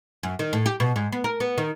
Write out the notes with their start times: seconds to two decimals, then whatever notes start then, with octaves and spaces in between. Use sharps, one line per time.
0.23 F#2
0.39 D#3
0.53 A2
0.66 G4
0.80 B2
0.96 G#2
1.12 B3
1.24 A#4
1.40 B3
1.58 D#3